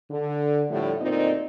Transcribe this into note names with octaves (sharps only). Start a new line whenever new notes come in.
D3
A2 D3 F3 G3 A3
D2 A#2 C4 D#4 D5 D#5